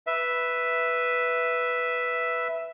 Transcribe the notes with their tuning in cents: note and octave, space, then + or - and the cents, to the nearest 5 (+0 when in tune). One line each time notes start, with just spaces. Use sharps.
B4 +0 E5 +0